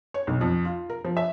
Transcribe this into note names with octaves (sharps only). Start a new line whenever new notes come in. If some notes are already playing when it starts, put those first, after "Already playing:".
C#5
B1
F2
F4
A#4
F3
E5